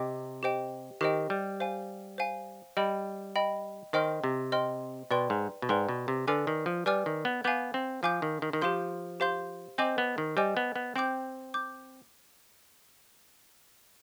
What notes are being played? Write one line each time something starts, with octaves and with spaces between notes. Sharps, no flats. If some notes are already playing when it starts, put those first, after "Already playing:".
Already playing: C3 D#5 G5 D6
G4 C5 D#5 G5
D#3 G4 C5 D#5 G5
G3
C5 F5 G#5
C5 F5 G#5
G3 D#5 G5 B5
D#5 G5 B5
D#3 C5 D#5 G5 C6 F6
C3
C5 D#5 G5 C6 F6
B2 B4 D5 G5 C6
G#2
B2
G#2 B4 D5 G5 C6
B2
C3
D3 B4 D5 G#5 D6 F6
D#3
F3
G3 B4 D5 G#5 D6 F6
D#3
B3
B3 F5 G#5 D6 G6
C4
F3 F5 G#5 D6 G6
D#3
D#3
D#3
F3 G4 C5 F5 C6 G6
G4 C5 F5 C6 G6
C4 C5 D#5 G#5 D6 G6
B3
D#3
G3 C5 D#5 G#5 D6 G6
B3
B3
C4 C5 G5 D6 G6
D6 G6